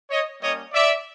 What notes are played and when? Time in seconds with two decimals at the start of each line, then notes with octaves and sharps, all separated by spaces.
0.10 C#5 D#5
0.42 G3 A#3 C#4 C#5 D#5
0.73 D5 E5